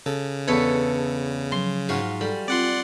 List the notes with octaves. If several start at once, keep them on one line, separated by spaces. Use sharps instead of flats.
C#3 A4
E2 D3 A4 B4 C#5
F3 F#3 C6
G#2 F4 F#4 F5
G3 A4
C4 F4 D5 F#5 C6